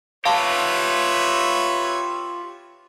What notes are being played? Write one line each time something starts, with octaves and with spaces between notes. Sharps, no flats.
F4 G4 B4 C#5 E5 F5 A5 C6